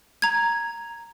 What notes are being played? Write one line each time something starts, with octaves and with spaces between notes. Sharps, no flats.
A#5 G#6